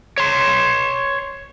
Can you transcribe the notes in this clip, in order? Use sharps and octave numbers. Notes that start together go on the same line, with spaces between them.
C#5 C6